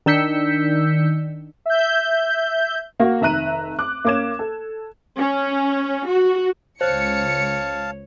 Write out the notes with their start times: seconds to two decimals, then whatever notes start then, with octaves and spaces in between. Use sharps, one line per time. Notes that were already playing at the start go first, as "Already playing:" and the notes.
0.06 D#3 D4 E6 G6 B6 C#7
1.66 E5 G6
3.00 A#3 F#4
3.21 F1 D#3 E5 A#5 F#6 D#7
3.79 D6 F#6
4.05 A#3 C#4 D6 G#6 E7
4.39 A4
5.18 C#4
6.08 F#4
6.81 C#2 C5 C#5 F5 A5 C#7